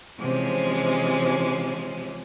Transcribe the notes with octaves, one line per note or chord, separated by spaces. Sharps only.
C3 E3 F3 G#3 C#4